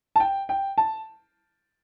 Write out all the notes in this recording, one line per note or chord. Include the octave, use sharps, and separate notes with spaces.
A5
G5
G5
A5